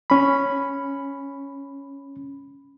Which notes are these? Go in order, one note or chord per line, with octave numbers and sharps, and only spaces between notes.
C#4 B5